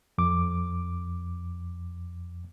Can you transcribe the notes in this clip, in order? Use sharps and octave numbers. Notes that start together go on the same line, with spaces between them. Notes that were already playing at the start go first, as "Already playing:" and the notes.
F2 D6